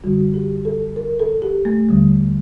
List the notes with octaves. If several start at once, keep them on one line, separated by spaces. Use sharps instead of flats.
F#2 D3 G3 F#4
G4
A4
A#4
A4
G4
A3
D#2 D3 G3